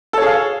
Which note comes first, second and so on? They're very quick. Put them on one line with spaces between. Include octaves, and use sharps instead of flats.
A4 C#5 G#4 F5